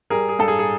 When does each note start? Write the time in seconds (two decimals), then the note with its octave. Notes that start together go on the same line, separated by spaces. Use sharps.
0.10 G3 G#4 A#4
0.29 G#4
0.39 G2 A4
0.48 G#4
0.59 G#4